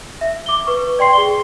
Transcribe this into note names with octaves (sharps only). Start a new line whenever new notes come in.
E5
D6 G7
B4 C#6
D5 G5 C6 C7
G#4 G7